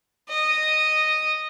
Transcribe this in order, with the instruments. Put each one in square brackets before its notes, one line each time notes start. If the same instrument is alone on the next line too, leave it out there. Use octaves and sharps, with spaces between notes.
[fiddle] D#5